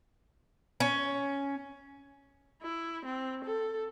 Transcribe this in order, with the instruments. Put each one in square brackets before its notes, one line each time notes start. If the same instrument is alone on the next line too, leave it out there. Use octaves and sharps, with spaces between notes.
[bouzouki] C#4
[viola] E4
C4
A4